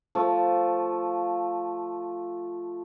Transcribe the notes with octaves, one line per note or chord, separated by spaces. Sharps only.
F3 A3